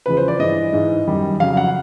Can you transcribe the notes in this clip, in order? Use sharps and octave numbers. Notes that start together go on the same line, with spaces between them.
E2 C#3 F3 G#3 B4
C5
D5
G2 E3 G#3 D#5
G#2 E3 G#3
F#2 D#3 G3
F2 C#3 F#3 F5
F#5